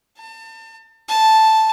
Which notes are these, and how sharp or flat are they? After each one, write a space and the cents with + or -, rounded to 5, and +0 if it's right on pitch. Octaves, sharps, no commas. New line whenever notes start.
A5 +35
A5 -5